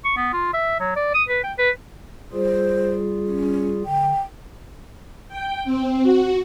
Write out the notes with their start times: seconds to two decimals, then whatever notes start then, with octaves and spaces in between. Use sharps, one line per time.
0.05 C#6
0.17 B3
0.33 F4
0.54 E5
0.80 F#3
0.96 D5
1.15 D#6
1.29 B4
1.44 G5
1.58 B4
2.33 G3 F4 G#4 C5
3.26 C#4
3.85 D3 G5
5.29 G5
5.65 C4
6.02 F#4